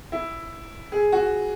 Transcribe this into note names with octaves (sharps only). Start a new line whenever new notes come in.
E4
G#4
F#4